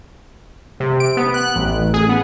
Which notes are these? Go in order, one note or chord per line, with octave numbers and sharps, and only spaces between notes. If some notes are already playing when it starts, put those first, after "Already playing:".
C3
D7
B3
F#6
A1
G#4
B3